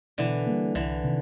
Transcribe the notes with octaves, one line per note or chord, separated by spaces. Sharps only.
B2 D3 E3
G3 A#3
C2 D3 E3
C3 D#3